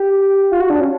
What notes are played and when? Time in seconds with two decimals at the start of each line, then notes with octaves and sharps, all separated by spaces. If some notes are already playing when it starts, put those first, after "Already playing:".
Already playing: G4
0.52 F4
0.60 F#4
0.70 D4
0.80 C#4